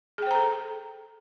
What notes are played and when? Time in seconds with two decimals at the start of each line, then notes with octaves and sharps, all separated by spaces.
0.18 G#4
0.22 G5
0.27 C5
0.31 A#5
0.35 A4